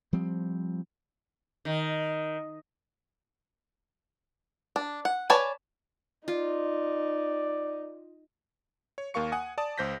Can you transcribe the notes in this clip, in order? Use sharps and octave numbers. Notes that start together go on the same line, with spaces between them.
F3 G3 C4
D#3
D4
F#5
B4 C#5 D5 G#5 A5
D#4 F4 D5
C#5
D#2 A#3 A#4 F5 C#6 C#7
F#5 G#5 D#6
D5 A5 D#6
C#2 C5 G6 A#6 B6